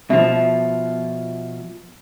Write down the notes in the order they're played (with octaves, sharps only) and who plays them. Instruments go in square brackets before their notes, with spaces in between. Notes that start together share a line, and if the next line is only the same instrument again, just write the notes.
[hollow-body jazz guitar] B2 F3 [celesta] E5